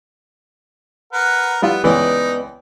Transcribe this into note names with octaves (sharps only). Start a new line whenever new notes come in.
A#4 B4 F#5
G3 B3 E4 F4
C#2 E3 B3 D#4 B4 D5